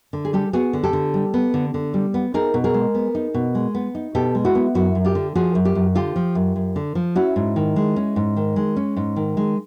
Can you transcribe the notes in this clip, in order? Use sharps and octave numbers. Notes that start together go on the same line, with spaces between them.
D3
G#4
G3 G4 A4
B3 F#4 G#4
D3
G4 A4
D3
G3
B3
D3
D3
G3
B3
D#4 G#4 A#4
B2
G#4 A#4
G#3
B3
D#4
B2
G#3
B3
D#4
B2 G4 A4
G#3
E4 F#4
B3
F#2 E4 F#4
F#2
F4 G4
D3
F3 F#4 G#4
F#2
F4 G4
F#2
D3 F4 G4
F3
F#2
F#2
D3
F3
C#4 E4 F#4
G#2
D#3
G#3
C#4
G#2
D#3
G#3
C#4
G#2
D#3
G#3